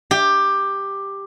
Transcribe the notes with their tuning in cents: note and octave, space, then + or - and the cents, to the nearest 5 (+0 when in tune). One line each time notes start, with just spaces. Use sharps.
G4 +10